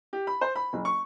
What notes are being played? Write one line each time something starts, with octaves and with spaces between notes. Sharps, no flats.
G4
B5
C5
B5
F#1
C#6